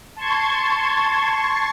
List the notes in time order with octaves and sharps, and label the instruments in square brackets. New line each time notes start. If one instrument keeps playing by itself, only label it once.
[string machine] A5 C6 C#6 G#6